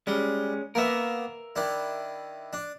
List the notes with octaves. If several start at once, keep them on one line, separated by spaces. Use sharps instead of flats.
G3 G#3 C#4
A#3 B3 A#4 E5
D#3 D4 E4
D4